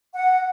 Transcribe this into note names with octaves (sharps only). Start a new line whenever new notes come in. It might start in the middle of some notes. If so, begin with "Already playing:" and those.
F#5